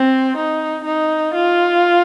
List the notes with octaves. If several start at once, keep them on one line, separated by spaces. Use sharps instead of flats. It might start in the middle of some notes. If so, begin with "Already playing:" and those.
Already playing: C4
D#4
D#4
F4